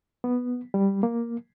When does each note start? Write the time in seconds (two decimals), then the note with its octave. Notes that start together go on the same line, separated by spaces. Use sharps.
0.24 B3
0.74 G3
1.03 A#3